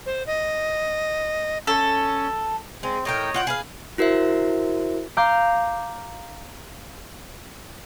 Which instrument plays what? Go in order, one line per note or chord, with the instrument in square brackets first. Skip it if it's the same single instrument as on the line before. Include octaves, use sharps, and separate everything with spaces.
[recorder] C5
D#5
[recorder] C#4 [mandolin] A4
[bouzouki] G#3 [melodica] C4
[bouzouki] A2 A#4 G5 [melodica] C#5 D#5
[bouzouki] F4 F#5 G5
G#4 B4 F5
[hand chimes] E4 F#4 A#4 C5 E5
[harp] F5 A#5 D6 F6 G6